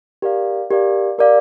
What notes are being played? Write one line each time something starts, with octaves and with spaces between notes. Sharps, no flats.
G4 A#4 D5 F5
G4 A#4 D5 F5
G4 A#4 D5 F5